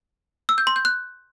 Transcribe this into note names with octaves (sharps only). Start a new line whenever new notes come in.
E6
G6
C6
G6
F#6